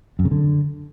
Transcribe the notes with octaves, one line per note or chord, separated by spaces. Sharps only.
F#2
C#3
D3